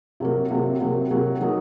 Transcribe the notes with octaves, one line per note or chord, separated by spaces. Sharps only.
C3 F#3 A#3
C3 F#3 A#3
C3 F#3 A#3
C3 F#3 A#3
D#3 F#3 A#3 D#4